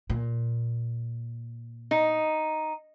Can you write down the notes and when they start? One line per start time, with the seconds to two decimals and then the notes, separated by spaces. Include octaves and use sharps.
0.10 A#2
1.91 D#4